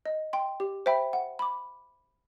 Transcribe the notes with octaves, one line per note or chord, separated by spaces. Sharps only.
D#5
G5 C6
G4
C5 E5 G5 B5
F#5
B5 D6